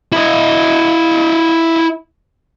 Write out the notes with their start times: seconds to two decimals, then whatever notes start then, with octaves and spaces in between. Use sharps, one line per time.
0.12 E4 D#5